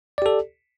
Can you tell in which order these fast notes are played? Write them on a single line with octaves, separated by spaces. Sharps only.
D5 G4 A4